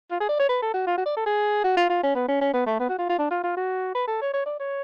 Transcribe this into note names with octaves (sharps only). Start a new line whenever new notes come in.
F4
G#4
D5
C#5
B4
A4
F#4
F4
F#4
D5
A4
G#4
F#4
F4
F4
C#4
B3
C#4
C#4
B3
A3
B3
F#4
F4
F4
D4
F4
F4
F#4
B4
A4
C#5
C#5
D5
C#5